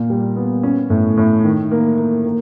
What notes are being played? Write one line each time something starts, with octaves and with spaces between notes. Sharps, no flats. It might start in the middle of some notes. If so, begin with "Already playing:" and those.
Already playing: A#2 A#3
G3
B3
C#4
A2
A2
D#3
A#3
A#3
A#3